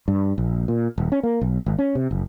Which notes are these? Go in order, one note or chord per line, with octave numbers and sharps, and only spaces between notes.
G2
A#1
A#2
D#1
C#4
A#3
B1
G#1
C#4
C3
F#1